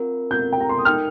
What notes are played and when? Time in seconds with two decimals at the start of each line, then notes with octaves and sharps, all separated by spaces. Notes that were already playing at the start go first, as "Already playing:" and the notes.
Already playing: C4 F4 A#4
0.31 C4 F4 A#4 G6
0.52 G5
0.60 A#5
0.69 C6
0.78 D#6
0.85 D#4 A#4 G5 F6